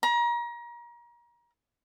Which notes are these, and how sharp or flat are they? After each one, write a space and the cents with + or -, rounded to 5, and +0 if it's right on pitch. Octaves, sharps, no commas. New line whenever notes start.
A#5 +30